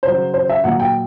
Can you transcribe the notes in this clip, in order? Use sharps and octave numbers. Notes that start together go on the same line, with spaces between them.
C#3 F#3 C5
C5
E5
A#2 F#3 F#5
G5